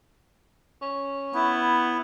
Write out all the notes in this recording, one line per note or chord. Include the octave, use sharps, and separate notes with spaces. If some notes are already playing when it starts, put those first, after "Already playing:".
C#4
B3 E4